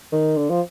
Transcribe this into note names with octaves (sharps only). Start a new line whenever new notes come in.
D#3
D3
F3